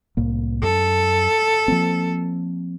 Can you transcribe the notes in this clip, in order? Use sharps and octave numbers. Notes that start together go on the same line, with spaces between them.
C2 A2 A#3
F#2 A4
F3 A#3 C4